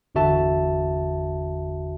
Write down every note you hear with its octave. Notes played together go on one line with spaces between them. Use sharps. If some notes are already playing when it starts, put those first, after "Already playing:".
G1 E2 D3 F#4 E5 A5